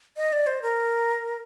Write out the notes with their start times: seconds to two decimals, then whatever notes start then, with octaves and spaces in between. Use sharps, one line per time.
0.17 D#5
0.32 D5
0.47 C5
0.62 A#4